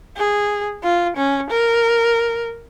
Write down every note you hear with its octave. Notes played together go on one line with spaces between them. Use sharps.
G#4
F4
C#4
A#4